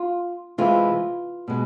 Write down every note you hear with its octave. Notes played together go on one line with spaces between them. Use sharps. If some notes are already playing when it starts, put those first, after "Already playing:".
Already playing: F4
C3 E3 G#3 F4
B2 G#3